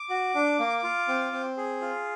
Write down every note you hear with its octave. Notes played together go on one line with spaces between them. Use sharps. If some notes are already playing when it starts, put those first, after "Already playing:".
Already playing: D6
F#4
D4
A#3
F4
C4
C4
G#4
F4